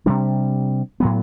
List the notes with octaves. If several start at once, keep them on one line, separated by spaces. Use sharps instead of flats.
C3 G3 D4
A2 F#3 B3